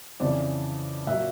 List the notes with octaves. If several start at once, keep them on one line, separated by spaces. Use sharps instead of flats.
F2 C#3 E3 C5 D5
A#2 F#3 E5 F#5